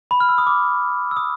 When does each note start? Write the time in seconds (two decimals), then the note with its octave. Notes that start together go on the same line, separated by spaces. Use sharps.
0.11 B5
0.20 F6
0.29 E6
0.38 D#6
0.47 D6
1.11 E6
1.16 D#6